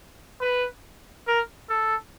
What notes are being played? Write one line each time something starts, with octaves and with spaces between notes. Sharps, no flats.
B4
A#4
A4